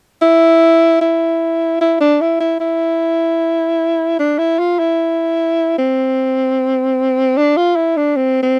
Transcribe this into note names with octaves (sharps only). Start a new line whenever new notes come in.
E4
E4
E4
D4
E4
E4
E4
D4
E4
F4
E4
C4
D4
F4
E4
D4
C4
C4